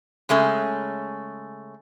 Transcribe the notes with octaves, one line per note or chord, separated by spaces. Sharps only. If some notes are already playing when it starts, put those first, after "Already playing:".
C#3 G#3 A3 C#4